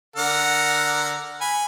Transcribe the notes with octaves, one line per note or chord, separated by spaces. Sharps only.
D3 A#4 F#5
G#5 B5